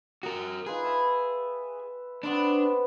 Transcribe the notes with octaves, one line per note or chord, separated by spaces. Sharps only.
F#4 A#4 G5 D#6
D#4 F4 G#4 B4
E5 A5 B5
B3 C4 D4 B4